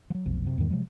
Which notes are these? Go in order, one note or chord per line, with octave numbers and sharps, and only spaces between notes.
F3 F#3
F1 B1 F3
F#2 C3
E2 G#2 D#3 G3
C3 F3 F#3 G#3